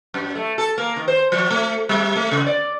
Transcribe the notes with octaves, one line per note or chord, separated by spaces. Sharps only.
F#2
A3
A4
A#3
D#3
C5
F3
A3
G3
A3
C#3
D5